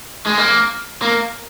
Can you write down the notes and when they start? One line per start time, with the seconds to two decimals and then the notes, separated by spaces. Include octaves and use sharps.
0.26 G#3
0.38 A#3
1.02 A#3